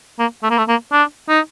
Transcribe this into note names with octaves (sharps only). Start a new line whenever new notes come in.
A#3
A3
A#3
A3
A#3
D4
D#4